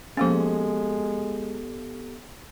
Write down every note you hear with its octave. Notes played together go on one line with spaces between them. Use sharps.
F3 G#3 A#3 B3 C#4 G4 A4